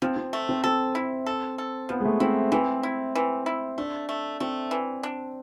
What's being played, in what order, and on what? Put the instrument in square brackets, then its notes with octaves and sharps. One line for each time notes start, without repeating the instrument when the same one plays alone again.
[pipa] F3 [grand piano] C4
[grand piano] C4
[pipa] A3
[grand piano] C4
[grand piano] C4 [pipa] A4
[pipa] E4
A4
A4
[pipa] F3 [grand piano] B3
[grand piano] G#3
A3
[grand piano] C4 [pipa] E4
[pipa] E3 [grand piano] C4
[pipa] E4
E3
E4
[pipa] A3 [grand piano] D4
[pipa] A3
[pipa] A3 [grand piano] C4
[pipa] E3
D4